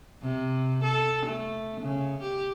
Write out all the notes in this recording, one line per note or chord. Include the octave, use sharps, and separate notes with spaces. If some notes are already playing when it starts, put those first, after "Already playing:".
C3
A4
A3
C#3
G4